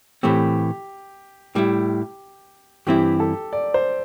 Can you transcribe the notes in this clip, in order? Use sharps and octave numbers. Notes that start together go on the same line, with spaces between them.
A2 E3 A3 C4 G4
A2 G3 E4 G4
G2 E3 C4 E4 G4
A4
D5
C5